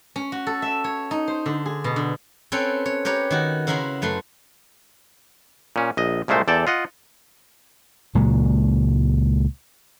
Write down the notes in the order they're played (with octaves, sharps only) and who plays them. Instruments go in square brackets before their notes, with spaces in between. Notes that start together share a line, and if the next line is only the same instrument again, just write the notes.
[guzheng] C#4
F#4
A4
E5
C#5
D#4
C5
D3
G#4
B2
D3
C4 C#4 A4 B4 C#5 G5
C#5
G4 A#4 B4 C#5
D#3 F#4
C#3 E4 F#4 A#4 B5 C6
F#2 A3 B4 C6
[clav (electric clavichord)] A#2 C#4
A#1 D#5
C2 A#2 G#3 A3 C5
E2 A4 D5 G5 A5
F4 D#5 F#5
[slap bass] C#2 A#2 F#3 G#3